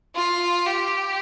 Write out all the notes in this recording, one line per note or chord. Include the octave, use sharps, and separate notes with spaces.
F4
G4